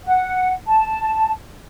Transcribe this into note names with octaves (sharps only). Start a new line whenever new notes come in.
F#5
A5